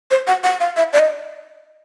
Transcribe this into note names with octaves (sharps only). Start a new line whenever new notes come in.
C5
F#5
F#5
F5
E5
D5
D#5